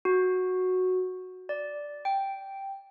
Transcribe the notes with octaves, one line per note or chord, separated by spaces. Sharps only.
F#4
D5
G5